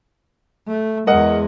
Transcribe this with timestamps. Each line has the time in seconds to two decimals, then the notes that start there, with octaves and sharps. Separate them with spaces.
0.68 A3
1.07 E2 G#3 A#4 D#5 F#5